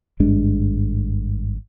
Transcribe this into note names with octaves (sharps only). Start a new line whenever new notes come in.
G#1 G2 G#3 D4